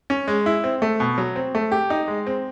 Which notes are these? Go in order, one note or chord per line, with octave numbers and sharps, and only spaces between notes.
C#4
G#3
E4
C4
A3
B2
F#3
C4
A3
G4
D#4
G#3
C4